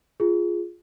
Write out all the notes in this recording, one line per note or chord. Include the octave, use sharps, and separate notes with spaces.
F4 G#4